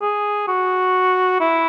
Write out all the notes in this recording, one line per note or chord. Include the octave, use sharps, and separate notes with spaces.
G#4
F#4
E4